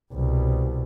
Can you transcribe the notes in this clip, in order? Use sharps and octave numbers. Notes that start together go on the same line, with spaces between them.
C2 B2